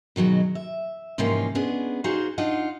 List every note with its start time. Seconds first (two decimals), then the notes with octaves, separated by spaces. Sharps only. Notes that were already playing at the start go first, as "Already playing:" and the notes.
0.16 B2 D#3 F#3 G#3
0.55 E5
1.18 G#2 C3 E3 F3 A#3 C#4
1.55 G#3 B3 C#4 D4 G#4
2.04 D#4 F#4 G#4 C5 F5
2.38 D4 D#4 F4 F#5